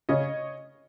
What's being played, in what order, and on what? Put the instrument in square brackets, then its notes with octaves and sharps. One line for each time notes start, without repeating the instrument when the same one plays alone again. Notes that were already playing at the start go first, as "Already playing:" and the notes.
[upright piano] C#3 C#5 D#5